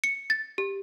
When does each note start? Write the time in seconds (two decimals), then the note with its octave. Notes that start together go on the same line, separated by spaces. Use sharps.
0.04 C#7
0.30 A6
0.58 G4